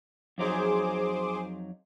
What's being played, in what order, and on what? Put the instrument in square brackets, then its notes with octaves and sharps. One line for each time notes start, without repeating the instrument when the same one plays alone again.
[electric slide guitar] F2 F#3 D#4 [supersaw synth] G#4 C5 D6